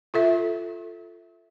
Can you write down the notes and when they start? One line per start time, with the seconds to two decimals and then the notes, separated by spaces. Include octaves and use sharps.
0.14 F4 A4 E5